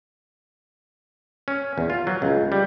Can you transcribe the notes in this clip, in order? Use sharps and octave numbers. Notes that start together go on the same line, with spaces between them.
C#4
E2
F4
F#3
C#2
G3